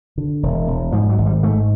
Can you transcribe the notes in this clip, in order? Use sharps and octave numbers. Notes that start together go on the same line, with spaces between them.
D3
E1
E1
G#2 F3
F#3
G#1
G3
G#2 A3